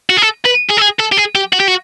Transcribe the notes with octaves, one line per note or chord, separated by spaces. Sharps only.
F#4
G#4
A4
B4
G#4
A4
G#4
A4
G4
G#4
G4
F#4
G4
F#4